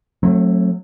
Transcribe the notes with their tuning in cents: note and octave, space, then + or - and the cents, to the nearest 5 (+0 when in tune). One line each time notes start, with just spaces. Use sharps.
F#3 -15 A3 +5 C4 +40